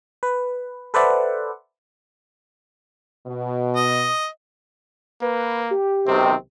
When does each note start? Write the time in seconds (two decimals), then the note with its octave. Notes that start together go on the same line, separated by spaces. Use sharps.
0.23 B4
0.94 A4 B4 C5 D5 E5 F#5
3.26 B2
3.76 D#5
5.22 A#3 B4
5.71 G4
6.07 B1 C3 D#3 C4